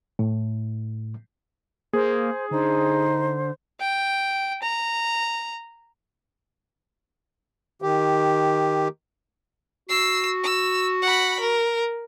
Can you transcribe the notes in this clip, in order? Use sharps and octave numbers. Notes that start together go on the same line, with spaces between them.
A2
A#3 G#4 C5
D3 D#4 C5
G5
A#5
D#3 G4
F#4 E6 C7
E6
F#5 B5
A#4